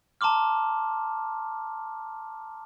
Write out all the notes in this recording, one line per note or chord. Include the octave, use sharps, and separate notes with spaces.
A5 A#5 C6 D6 F6